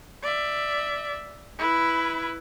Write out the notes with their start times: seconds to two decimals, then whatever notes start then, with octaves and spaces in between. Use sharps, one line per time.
0.23 D5 E5
1.59 E4 B4